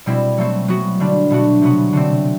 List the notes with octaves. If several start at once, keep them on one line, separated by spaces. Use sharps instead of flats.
B2 G3 C4 E4
F#3 A3 C4
F#3 B3 F#4
D3 G3 D4
B2 A3 D4 F#4
C3 F#3 B3 F#4
D3 A3 C4